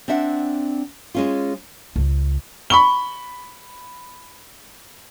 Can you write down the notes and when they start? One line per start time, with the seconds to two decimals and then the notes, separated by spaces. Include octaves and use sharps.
0.08 C4 D4 E5 F#5
1.15 G#3 C#4 F4
1.96 C#2
2.70 B5 C#6 G7